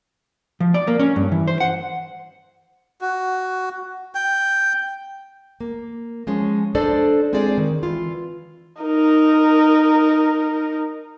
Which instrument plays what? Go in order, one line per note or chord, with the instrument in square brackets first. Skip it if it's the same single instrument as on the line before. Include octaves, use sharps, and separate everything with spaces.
[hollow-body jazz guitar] F3
D5
A#3
C#4
G2
E3
C5
F#5
[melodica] F#4
G5
[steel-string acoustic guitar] A#3
F3 G#3 C#4
D4 A4 C5 D5 D#5
G#3 C4 F4 G#4 D5
D#3
E3 F4
[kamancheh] D#4 A#4